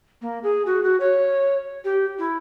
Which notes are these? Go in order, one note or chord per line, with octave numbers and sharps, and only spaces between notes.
A#3
G#4
F#4
F#4
C#5
G4
E4